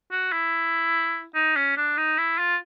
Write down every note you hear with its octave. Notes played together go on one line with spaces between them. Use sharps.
F#4
E4
D#4
C#4
D4
D#4
E4
F4